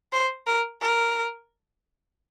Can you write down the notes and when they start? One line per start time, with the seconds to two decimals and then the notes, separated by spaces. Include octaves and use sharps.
0.12 C5
0.47 A#4
0.81 A#4